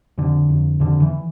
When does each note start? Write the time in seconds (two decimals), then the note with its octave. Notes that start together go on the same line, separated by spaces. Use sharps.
0.18 F2 D3
0.50 F2
0.80 F2 D3
1.02 E3